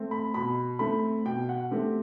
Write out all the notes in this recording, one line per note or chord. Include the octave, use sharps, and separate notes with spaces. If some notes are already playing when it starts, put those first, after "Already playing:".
Already playing: A3 C4
B5
B2 B5
A3 C4 B5
B2 G5
F#5
A3 C4 G4